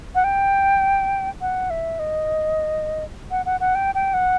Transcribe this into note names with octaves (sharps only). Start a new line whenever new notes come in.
F#5
G5
F#5
E5
D#5
F#5
F#5
F#5
G5
G5
F#5